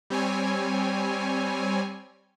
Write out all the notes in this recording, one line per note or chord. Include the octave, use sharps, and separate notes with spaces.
G3 C4 C#5 G#5